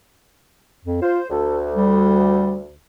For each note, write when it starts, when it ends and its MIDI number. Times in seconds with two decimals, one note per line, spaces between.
0.85 1.00 41
1.02 1.19 65
1.02 1.27 72
1.30 2.74 38
1.30 1.58 69
1.76 2.58 55